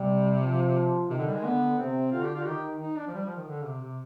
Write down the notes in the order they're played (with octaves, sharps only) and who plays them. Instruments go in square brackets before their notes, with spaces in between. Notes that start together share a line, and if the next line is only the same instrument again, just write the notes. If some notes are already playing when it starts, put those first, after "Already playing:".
Already playing: [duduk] C3 [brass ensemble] G3
[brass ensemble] F3
[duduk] C3 [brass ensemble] D#3
[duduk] D3
G3
G#3
[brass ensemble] D3 [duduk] B3
[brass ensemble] C3 [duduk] C4
[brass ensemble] D3 [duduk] F4
[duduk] G4
F4
[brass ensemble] D#3 [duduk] G4
[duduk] D#4
D4
F3
G3
F3
D#3
D3
C3
C3